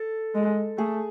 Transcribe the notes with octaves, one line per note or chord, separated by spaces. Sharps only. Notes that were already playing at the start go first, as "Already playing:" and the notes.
Already playing: A4
G#3
A3 G#4